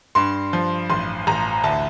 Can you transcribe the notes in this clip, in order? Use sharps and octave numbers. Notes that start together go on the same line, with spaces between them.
G2 C6
F3
A1 C6
A1 A#5
D2 A5